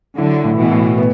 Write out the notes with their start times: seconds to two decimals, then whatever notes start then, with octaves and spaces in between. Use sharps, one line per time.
0.17 D3 F#3 E4
0.44 A2
0.57 B2 E3
0.71 A2
0.98 B3